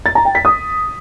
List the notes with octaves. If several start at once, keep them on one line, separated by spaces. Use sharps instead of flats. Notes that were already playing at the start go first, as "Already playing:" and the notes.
A6
A#5
G5
B6
D#6